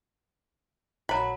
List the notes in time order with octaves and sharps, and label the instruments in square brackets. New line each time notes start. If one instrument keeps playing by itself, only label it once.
[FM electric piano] A#1 [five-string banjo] F#3 B5